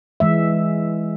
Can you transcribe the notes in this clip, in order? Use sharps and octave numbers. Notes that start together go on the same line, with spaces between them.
E3 G#3 E5